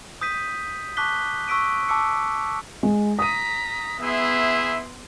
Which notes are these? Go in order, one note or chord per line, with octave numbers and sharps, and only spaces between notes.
D#6 G6 B6 D#7
A5 C#6 D6 F#6 B6 G7
C#6 E6 B6 D7 D#7
A5 D6 E6 C#7
G#3
A#5 D#6 B6 D#7
B3 E4 G#4 E5 C6